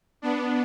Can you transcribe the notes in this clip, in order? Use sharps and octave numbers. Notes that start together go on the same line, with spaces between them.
B3 D4